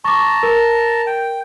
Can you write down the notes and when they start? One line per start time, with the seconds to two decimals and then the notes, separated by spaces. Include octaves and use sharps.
0.05 A5 A#5 C#6 D6
0.43 A#4
1.07 G5